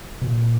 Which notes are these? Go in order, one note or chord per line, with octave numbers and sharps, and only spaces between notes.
B2
A#2